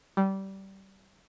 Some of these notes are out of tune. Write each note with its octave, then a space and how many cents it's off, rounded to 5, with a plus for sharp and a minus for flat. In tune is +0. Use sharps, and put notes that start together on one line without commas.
G3 -20